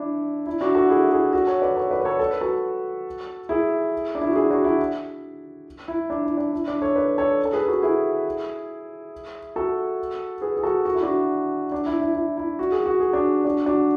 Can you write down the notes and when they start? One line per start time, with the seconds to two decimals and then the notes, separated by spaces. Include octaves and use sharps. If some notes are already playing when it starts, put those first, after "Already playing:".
Already playing: D4 E4
0.47 E4
0.61 D4 F#4
0.75 F#4 A4
0.90 E4 G#4
1.11 E4 G#4
1.33 F#4 A4
1.47 A4 C#5
1.62 B4 D5
1.76 A4 C#5
1.91 B4 D5
2.01 B4
2.05 A4 C#5
2.20 A4
2.31 B4
2.41 F#4 A4
3.49 E4 G#4
4.15 D4
4.21 E4
4.28 F#4
4.35 E4 G#4
4.50 D4 F#4
4.64 E4
5.88 E4
6.10 D4
6.24 E4
6.37 D4
6.52 E4
6.68 D4
6.82 A4 C#5
6.96 B4 D5
7.18 A4 C#5
7.45 A4
7.53 G#4 B4
7.68 F#4 A4
7.82 E4 G#4
9.56 F#4 A4
10.41 G#4 B4
10.57 G#4
10.63 F#4 A4
10.85 F#4
10.94 E4
11.03 D4 F#4
11.72 D4
11.86 E4
12.01 E4
12.15 E4
12.37 E4
12.59 F#4
12.72 G#4
12.86 F#4
13.00 G#4
13.13 D4 F#4
13.45 D4 F#4
13.66 D4 F#4